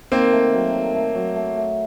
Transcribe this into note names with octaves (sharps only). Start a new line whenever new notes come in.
D#3 A#3 C4
A3
F#3
F#3
A3
F#3
A3
A3